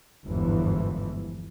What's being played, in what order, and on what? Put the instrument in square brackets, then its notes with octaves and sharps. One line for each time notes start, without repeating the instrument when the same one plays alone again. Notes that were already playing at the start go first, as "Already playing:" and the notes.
[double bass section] G1 E2 G#2 E3 F3